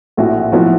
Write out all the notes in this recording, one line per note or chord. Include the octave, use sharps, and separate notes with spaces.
A#1 A2 F3 E4 F#4
B1 A2 F3 E4 F#4